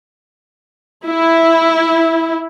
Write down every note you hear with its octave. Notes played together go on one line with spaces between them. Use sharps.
E4